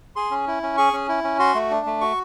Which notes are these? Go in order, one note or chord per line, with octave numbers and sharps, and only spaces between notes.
G#4 C6
C#4
E4
C#4
G#4 C#6
C#4
E4
C#4
F#4 C6
A3
D4
A3
F#4 C#6